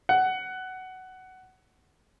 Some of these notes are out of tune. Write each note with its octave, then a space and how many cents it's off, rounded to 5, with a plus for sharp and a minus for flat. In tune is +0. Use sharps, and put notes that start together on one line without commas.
F#5 +15